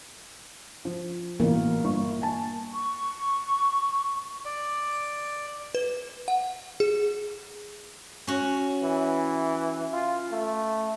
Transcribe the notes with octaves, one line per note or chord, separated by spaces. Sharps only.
F3
A1 B2 A#3
G1 C#6
G#5 A5
C#6
D5
B4
F#5
G#4
C#4 F#4
E3
F4
A3